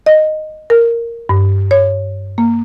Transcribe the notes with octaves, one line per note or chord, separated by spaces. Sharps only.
D#5
A#4
G2
C#5
A#3